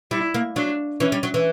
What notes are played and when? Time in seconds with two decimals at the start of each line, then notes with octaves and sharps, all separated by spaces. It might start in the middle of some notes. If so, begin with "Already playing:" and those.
0.11 G3 E4
0.34 A#3
0.56 F#3 D4
1.00 E3 C#4
1.12 G3
1.23 F#3
1.34 E3